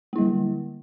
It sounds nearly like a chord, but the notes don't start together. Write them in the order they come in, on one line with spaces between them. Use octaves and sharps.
A#3 E4 G3 D3